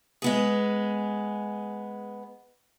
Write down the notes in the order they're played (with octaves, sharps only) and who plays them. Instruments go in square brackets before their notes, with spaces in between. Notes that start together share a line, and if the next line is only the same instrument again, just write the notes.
[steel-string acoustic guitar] G#3 B3 G#4